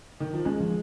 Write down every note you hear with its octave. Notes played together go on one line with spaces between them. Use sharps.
D#3
F3
G#3 C#4
F3